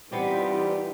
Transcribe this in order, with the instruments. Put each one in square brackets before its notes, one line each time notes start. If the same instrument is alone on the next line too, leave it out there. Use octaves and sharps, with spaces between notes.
[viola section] E3 D#4 F4 [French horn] G3 [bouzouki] B3 C4 G4